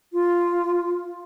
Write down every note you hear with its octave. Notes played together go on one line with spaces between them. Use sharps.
F4